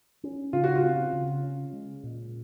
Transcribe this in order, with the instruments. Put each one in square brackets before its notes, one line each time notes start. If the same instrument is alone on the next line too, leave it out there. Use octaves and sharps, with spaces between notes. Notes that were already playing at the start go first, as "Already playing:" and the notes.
[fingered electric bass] C#4
[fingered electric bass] C#3 [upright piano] F4
[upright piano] F#4
F4
[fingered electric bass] C4
C#3
C#4
G#3
A#2